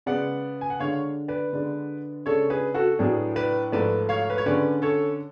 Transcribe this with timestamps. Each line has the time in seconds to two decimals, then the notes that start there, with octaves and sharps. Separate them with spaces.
0.06 C#3 G#3 B3 D5 F#5
0.61 G#5
0.70 F#5
0.80 D3 G#3 D4 C#5 F5
1.28 B4 D5
1.53 D3 G#3 B3 D4
2.26 C#3 G#3 D4 A4 C#5
2.50 G#4 B4
2.74 F#4 A4
2.99 A2 F#3 B3 D4 G#4
3.36 B4 D5
3.72 G#2 F3 A3 B4 D5
4.09 C#5 F5
4.30 B4
4.38 C#5
4.46 D3 G#3 C#4 B4 D5
4.82 A4 C#5